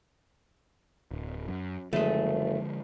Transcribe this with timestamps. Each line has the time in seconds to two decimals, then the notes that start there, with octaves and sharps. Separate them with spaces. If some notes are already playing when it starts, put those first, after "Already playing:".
1.11 D1
1.48 F#2
1.93 F#1 D3 F3 G#3 A3 G#4